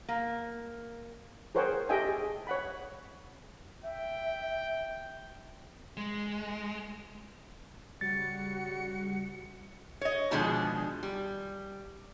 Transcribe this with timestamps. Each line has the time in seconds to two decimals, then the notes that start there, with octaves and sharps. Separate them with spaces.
0.08 A#3
1.55 G#4 A#4 C5 C#5 F#5 G5
1.89 G4 A4 D#5 E5 G5 G#5
2.09 G#4
2.47 C#5 F#5 B5
3.83 E5 G5
5.97 G#3
8.01 C#3 G3 F#4 A6 C#7
10.01 C#5 D#5
10.31 B2 D#3 F3 G#3 D4 G#4
11.03 G3